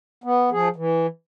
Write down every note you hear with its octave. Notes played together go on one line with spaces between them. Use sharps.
B3
F3 G#4
E3